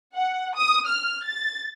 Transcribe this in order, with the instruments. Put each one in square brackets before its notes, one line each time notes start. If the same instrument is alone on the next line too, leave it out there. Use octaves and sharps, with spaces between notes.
[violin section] F#5
D#6
F6
A6